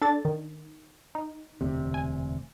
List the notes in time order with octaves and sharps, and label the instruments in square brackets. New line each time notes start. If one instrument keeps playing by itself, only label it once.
[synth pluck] D4 A4 A6
D#3
D#4
[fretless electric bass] E1 D2 C3
[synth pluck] G#5